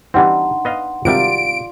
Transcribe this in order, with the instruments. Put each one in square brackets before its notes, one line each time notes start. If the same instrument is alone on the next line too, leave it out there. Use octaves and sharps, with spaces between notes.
[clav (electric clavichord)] E3 G3 C4 [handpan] D4 D#4 [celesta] F#5 C6
[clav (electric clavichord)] B3 D#5 F5
[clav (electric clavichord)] G#1 C3 G3 [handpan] F4 D5 [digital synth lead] D7